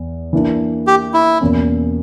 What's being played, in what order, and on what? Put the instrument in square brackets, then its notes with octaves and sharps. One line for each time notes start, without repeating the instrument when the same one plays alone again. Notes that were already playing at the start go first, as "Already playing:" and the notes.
Already playing: [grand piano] E2
E3 A#3 D4
[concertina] G4
E4
[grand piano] E2 B2 A#3 C#4